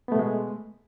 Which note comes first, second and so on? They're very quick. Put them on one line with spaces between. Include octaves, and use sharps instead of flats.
B3 A3 B2 G#3